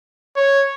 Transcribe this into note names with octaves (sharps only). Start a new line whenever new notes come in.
C#5